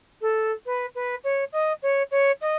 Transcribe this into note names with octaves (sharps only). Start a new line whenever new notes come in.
A4
B4
B4
C#5
D#5
C#5
C#5
D#5